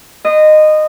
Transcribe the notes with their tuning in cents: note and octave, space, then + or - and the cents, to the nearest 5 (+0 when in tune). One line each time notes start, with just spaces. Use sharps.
C5 -45 D#5 -15